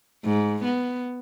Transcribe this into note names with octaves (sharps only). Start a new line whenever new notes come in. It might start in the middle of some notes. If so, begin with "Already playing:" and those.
G#2
B3